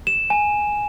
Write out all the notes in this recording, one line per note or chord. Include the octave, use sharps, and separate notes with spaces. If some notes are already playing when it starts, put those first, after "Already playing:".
E7
G#5